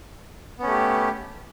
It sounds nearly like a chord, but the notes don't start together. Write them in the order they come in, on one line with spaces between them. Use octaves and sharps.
B3 C#4 A3 G4